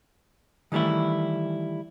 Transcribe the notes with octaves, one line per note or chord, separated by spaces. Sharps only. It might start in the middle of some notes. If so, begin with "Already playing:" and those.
D#3 E3 G3 A3 E4